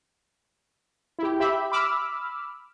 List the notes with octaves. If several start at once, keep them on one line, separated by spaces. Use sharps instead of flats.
E4 G4
G4 E5 B5
B5 D6 E6 F6